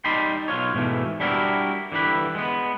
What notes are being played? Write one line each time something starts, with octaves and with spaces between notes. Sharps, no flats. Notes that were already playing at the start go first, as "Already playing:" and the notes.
G3 D#4 A5 B5 C6
B1 F4 C#5
G#2 B2 E3 A3
G3 D4 E4 F#4 A#4
D3 E3 G3 B4
G#3 B3